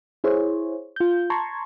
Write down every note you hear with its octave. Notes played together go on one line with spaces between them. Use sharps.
E4 G#4 C5 C#5
F4 G6
A5 A#5 C6 C#6 G#6